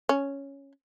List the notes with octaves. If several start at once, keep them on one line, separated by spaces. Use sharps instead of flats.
C#4